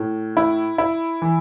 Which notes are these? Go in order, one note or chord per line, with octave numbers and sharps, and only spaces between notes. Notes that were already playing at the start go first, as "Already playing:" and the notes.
Already playing: A2
E4
E4
E3